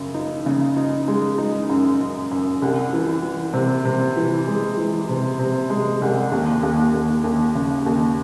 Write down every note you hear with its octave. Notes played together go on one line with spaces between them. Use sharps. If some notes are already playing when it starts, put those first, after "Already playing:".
Already playing: F#2 C#3
D#4
C#3
D#4
G#3
D#4
F#2
F#2
F#2
C2
E3
E3
C3
C3
E3
G#3
E3
C3
C3
G#3
C2
D#2
D#2
D#2
D#2
C#3
D#2